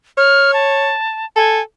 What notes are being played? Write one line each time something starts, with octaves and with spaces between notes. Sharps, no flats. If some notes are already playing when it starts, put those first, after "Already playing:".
C#5 F6
A5
A4 G#5